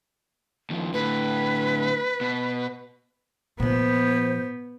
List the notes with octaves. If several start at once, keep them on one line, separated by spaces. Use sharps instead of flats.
D#2 F3
A2 D3 B4
B2
A#2 F3 B3 C5